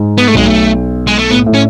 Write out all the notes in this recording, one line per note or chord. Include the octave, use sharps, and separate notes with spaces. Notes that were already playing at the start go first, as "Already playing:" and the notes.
Already playing: G#2
B3
A3
B1 B2 G#3
A3
G#3
A3
A2 B3
A2
C#4